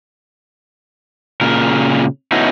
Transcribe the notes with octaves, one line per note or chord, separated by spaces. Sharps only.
A#2 C#3 A#4
A3 B3 C#4 D#4 E4 F#4